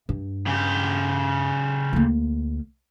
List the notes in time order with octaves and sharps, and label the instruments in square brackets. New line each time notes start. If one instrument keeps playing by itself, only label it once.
[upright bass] G2
[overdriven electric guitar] C#3 G4
[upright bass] D2 A#3